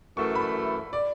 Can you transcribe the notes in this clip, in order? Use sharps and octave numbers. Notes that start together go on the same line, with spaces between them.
F#2 E3 A3 C#6
B5
D5